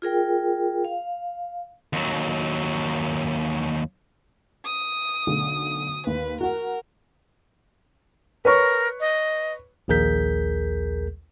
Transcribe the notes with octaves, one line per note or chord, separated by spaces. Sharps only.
F4 G#4 A#4 G5
F5
D#2 F#3
D#6
B1 D3 A3
D#2 B4
F#4 A#4 F#5
A#4 B4 C#5 C#6
D#5
A#1 D#2 G#4 A#4 G6 B6